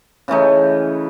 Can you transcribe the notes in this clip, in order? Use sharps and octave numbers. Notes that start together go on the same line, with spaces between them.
C#3 E3 A3 D#4